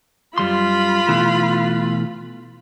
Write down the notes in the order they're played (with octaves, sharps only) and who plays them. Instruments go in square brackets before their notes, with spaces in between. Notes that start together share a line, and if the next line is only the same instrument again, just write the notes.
[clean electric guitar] F#2 G3 C6 [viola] F4 B5
[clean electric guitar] B2 E3 A3